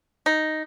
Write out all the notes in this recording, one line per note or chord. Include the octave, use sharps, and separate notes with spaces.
D#4